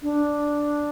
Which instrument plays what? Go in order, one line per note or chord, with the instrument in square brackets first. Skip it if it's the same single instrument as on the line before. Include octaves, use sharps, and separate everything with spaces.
[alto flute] D4